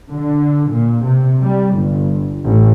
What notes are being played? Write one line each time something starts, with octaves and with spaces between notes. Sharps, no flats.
D3
A#2
C3
G3
G1
A1